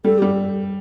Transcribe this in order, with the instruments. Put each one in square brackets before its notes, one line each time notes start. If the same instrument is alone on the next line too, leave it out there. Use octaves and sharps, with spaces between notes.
[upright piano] G3 [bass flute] A4
[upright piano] G3 [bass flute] G4